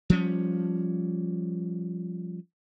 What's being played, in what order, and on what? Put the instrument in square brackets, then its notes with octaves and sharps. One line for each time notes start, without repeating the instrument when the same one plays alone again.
[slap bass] F3 G3 C#4